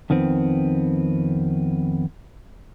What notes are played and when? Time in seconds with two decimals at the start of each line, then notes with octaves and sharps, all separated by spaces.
0.10 F2 D#3 B3 C4